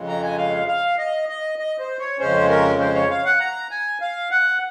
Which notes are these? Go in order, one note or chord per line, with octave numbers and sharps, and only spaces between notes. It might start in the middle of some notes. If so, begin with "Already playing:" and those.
Already playing: F2 C#3 G#3
A#5
G#5
F5
F5
D#5
D#5
D#5
C5
C#5
F2 C#3 G#3 C#4 C5
A#4
C5
C#5
F5
F#5
A#5
G#5
F5
F#5